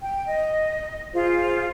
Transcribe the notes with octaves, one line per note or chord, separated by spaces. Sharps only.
G5
D#5
F4 G#4 C5